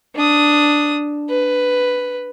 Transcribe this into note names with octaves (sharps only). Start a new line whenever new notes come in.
D4 D#6
B4